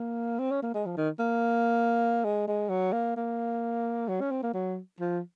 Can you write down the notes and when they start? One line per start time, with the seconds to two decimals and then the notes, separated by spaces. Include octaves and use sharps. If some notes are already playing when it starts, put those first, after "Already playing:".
Already playing: A#3
0.39 C4
0.51 C#4
0.62 A#3
0.74 G#3
0.86 F3
0.97 D#3
1.19 A#3
2.24 G#3
2.47 G#3
2.69 F#3
2.92 A#3
3.17 A#3
4.08 F#3
4.21 C#4
4.31 C4
4.43 A#3
4.54 F#3
5.00 F3